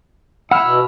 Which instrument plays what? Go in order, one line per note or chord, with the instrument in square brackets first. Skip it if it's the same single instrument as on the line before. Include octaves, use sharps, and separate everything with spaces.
[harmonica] E4 E6 [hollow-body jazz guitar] F#5 [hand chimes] B5 F6
[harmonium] B2